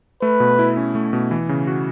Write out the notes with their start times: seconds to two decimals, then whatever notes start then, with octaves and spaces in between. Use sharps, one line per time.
0.22 A3 B4
0.40 B2
0.59 E4
0.77 C#4
0.95 A3
1.13 B2
1.31 E3
1.49 C#3
1.67 F#4